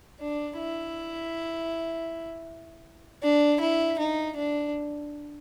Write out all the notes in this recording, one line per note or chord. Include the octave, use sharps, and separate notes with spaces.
D4
E4
D4
E4
D#4
D4